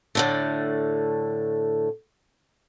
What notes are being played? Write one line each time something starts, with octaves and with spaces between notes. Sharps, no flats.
A2 D3 A3